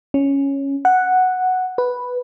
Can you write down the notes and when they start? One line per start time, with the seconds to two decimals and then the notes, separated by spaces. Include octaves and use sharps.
0.14 C#4
0.85 F#5
1.78 B4